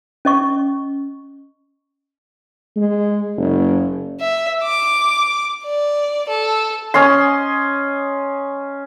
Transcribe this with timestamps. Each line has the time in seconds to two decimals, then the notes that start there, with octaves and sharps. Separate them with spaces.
0.25 C#4 D#5 C#6
2.76 G#3
3.37 F#1
4.20 E5
4.63 D6
5.65 D5
6.29 A4
6.94 C#4 D#5 C6